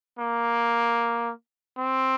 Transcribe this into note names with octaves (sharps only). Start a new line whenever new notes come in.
A#3
C4